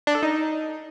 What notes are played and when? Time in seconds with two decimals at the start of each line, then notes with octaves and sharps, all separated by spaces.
0.07 D4
0.15 A4
0.23 D#4